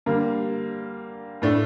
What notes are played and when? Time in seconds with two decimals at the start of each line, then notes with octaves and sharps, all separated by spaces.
0.06 D3 G3 A#3
1.42 A2 A3 D4